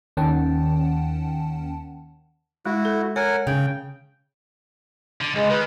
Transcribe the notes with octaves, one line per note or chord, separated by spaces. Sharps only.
D#2 D#3 C#4 F#5 G5 A5
G#3 E4 F#4
A4
A#4 C#5 F#5 G#5
C#3 G5
D3
C#2 G#3
D#3 B4